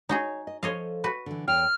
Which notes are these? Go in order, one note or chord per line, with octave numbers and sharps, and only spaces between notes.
D#4 F#4 G#4 C#5
D#5
F3 A4 C5 C#5 D#5 F5
F#4 B4
D3 E3
E2 C#5 G5 F6